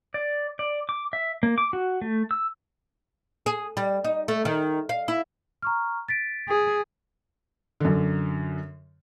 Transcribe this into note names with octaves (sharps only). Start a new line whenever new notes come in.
D5
D5
D6
E5
A#3
D6
F#4
A3
E6
G#4
G3
D#4
A3
D#3
F5
E4
A#5 C#6 F6
A6 B6 D7
G#4
F#2 D3